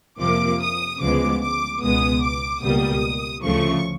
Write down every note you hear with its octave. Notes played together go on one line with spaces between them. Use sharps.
F2 C3 F3 A#3 D6
D#6
D2 C#3 F3 G#3 B3 D6
D6
C#2 B2 G#3 B3 D#6
D6
C#2 B2 G3 A#3 D#6
D2 C#3 F3 A3 C#6